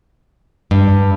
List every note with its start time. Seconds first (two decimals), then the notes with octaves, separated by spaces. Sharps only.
0.71 G2